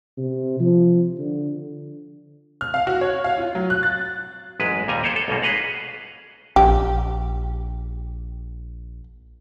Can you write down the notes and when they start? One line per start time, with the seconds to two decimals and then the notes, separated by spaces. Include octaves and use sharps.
0.18 C3
0.60 F3
1.18 D3
2.61 F6
2.74 F5
2.87 F#4
3.01 C#5
3.24 F5
3.38 F4
3.55 F#3
3.70 F#6
3.83 A6
4.60 A1 F#2 G#3 B4
4.88 D#2 A#2 G3 G#5 A#5
5.03 G#4 A4 C5 C#5 F5 G5
5.16 A4
5.28 B1 G#2 B2 A#3
5.42 G#4 B4 D#5 F5 F#5
6.56 A#1 G4